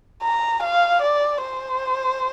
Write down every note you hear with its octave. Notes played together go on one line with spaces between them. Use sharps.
A#5
F5
D5
C5